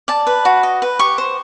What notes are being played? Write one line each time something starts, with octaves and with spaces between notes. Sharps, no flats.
D5 A5
B4
F#4
D#5
B4
G4 C#6
C5